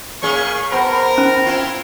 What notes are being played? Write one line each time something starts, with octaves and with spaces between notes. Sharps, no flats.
A3 A#3 C#4 G#4 C#6
B3 A#4 C5 A5 B5
C#4
C4 E4 F4